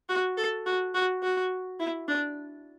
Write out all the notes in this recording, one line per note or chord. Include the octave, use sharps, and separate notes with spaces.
F#4
A4
F#4
F#4
F#4
E4
D4